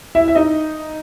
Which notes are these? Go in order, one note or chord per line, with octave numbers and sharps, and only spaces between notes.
E4 E5
E5
D#4 D#5